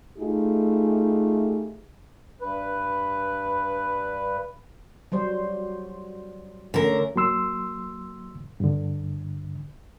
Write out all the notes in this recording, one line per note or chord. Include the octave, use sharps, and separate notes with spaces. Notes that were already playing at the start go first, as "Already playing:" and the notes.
A3 D#4 F4 G4 G#4
G2 B4
F#3 G3 C5
D3 A3 C#4 A#4
F#3 A#3 C6 E6
G2 D3